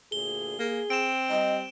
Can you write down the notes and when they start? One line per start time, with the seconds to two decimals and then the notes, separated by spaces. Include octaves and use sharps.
0.12 D2 A#2 G#4 G7
0.59 A#3 G#4
0.90 C4 D7 E7
1.30 G3 D#5